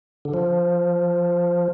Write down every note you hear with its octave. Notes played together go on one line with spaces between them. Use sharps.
D3
F3